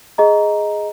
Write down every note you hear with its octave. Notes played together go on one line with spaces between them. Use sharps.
G#4 D#5 A#5